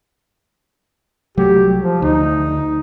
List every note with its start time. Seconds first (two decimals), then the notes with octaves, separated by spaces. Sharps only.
1.37 C2 F#3 A3 G4
1.81 F3
2.02 D2 D#4